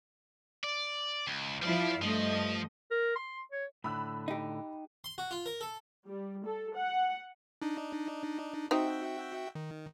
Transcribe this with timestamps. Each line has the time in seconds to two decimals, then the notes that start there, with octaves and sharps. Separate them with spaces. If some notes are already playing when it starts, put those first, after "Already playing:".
0.64 D5
1.27 C#2
1.62 F3 G3 E4 D5 F5
2.02 G2 F3 A3 D#5
2.91 A#4
3.16 C6
3.52 C#5
3.84 A2 D3 B5 E6 F#6
4.28 D#4 G4
5.04 C6
5.18 F#4
5.31 F4
5.46 A#4
5.61 A4
6.08 G3
6.46 A4
6.77 F#5
7.62 D4 D#4
8.71 C4 D#4 F#4 E5 G5
9.55 D#3